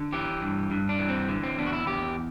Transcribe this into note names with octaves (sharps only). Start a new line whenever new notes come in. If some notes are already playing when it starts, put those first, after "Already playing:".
Already playing: D3
E3 G4
G2
G2
D4
E3
C4
D3
C4
E2 D4
F#4
E4
E2 G4